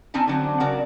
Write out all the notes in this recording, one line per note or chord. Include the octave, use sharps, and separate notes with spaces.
C4 C#4 D#4 G#5 A5
D3 F#3 C4
C#3 F#4 A#4 D5